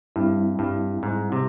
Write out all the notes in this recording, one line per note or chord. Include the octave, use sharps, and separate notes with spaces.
G2 G3 C4 E4
G2
G#2
C3